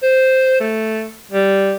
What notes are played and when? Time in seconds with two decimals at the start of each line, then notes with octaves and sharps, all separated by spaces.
0.03 C5
0.60 A3
1.32 G3